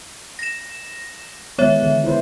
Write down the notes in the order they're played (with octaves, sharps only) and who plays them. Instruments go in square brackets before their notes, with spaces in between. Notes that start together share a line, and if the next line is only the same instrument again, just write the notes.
[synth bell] A#6 E7
[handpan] D#3 E3 G#3 [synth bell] B3 C#5 E5
[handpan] D3
E4 B4 C5